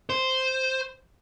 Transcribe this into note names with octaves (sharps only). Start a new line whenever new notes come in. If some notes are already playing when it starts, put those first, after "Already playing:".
C5